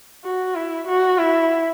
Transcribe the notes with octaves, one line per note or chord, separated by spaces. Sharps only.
F#4
E4
F#4
E4